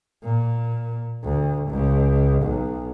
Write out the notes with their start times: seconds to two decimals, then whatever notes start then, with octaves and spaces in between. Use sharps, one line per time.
0.23 A#2
1.24 D2
1.69 C#2
2.43 B1